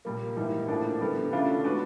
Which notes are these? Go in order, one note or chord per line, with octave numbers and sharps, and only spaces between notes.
A#2 G3 A#3
G#2 E3 G3 A#3 D#4
A2 F3 A#3 D4
D3 G3 B3
C#3 E3 A3 D4 F4
G#3 B3 D4 F#4 B4